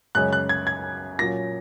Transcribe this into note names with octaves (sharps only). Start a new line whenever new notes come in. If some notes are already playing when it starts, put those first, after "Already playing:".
F#2 C#3 G#3 C#4 F#6
F#6
G#6
G#6
A#2 F#3 C#4 A#6